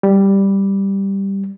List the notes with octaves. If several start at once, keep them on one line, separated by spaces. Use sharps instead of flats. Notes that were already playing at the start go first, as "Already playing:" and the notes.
G3